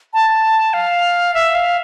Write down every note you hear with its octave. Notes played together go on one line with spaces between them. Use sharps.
A5
F5
E5
F5